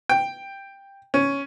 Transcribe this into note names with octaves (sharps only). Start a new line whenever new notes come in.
G5
C#4